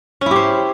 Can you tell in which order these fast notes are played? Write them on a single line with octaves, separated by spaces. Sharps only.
C#4 E4 G4 C5